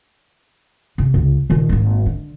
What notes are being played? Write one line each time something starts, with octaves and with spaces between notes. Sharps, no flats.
C3
C#2
A#2 D#3
G#1 A#3
D3